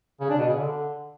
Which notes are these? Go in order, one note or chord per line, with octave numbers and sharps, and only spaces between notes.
C#3
D4
B2
C#3
D3